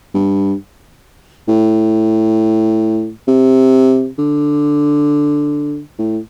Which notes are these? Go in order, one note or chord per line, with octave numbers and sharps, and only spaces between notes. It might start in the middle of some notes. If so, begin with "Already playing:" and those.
G2
A2
C3
D3
A2